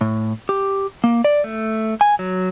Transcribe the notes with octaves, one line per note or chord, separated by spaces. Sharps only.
A2
G4
A#3
D5
A3
G#5
F#3